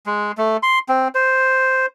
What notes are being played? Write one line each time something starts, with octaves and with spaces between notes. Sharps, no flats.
G#3
A3
C6
C4
C5